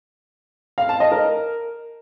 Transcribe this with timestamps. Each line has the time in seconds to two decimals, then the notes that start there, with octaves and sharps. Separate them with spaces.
0.78 F5
0.89 A5
1.00 D#5
1.12 A#4